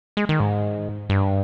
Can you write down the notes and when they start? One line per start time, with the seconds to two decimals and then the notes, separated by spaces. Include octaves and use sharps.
0.17 G#3
0.29 D#3
0.40 G#2
1.10 G2